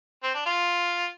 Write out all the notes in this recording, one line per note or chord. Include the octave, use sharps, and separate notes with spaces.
C4
D4
F4